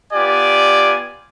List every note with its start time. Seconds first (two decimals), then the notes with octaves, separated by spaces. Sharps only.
0.13 B3 F4 G4 D5 G#5